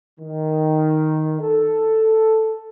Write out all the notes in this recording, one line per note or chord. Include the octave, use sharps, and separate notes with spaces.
D#3
A4